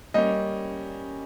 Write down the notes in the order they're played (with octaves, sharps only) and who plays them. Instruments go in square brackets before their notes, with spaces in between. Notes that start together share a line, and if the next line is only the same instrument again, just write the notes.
[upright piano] G3 A#3 C#4 [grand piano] D#5